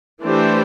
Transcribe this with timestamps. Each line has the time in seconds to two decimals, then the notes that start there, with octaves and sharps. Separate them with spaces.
0.22 E3 A3 D4 G4 C5